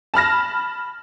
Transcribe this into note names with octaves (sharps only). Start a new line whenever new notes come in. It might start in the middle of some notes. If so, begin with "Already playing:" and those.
A5 B5 F6 A#6